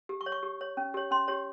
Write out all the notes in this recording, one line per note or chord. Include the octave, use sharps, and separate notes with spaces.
G4
C#6
C#5
C#6
G4
C#5
C#4
G4 C#5
C#4 C6
G4 C#5